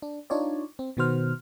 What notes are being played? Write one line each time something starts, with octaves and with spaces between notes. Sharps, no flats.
D4
D4 D#4 F4 C#5 D5
C4
B2 D#3 B3 F#4 C5 F6